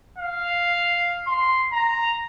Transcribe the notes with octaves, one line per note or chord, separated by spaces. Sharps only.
F5
C6
A#5